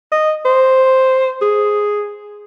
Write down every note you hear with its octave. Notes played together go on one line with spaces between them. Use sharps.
D#5
C5
G#4